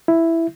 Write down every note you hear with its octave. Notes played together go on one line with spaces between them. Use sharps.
E4